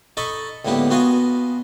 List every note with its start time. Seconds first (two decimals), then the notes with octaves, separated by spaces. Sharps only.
0.17 D#4 A4 D#5 A5 B5 C#6
0.65 C#2 A2 D3 A#3 B3 G4
0.90 B3 F4 F#4 D#5 F5 G#5